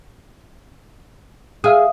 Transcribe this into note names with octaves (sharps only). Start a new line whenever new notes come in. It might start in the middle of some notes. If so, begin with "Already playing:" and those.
G#4 E5 F5 D#6